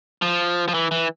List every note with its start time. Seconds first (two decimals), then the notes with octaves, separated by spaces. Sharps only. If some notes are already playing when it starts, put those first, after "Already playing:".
0.22 F3
0.68 F3
0.74 E3
0.91 E3